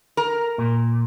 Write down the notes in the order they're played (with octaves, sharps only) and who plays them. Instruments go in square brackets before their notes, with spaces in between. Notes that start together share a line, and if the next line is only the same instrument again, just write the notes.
[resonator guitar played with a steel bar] A#4
[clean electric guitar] A#2